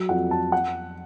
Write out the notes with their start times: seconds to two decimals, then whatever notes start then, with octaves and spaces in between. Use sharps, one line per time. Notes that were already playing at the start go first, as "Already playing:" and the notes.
Already playing: F#3
0.09 F2 F#5
0.31 F2 A5
0.52 F#5